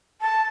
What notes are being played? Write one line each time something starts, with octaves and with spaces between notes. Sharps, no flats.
A5